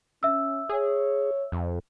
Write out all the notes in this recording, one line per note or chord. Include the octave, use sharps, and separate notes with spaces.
C#4 E5 E6
G#4 C#5
F2